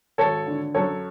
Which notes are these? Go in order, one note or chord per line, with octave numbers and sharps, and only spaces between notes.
G#1 A4 C#5
D3
F#2 A4 C#5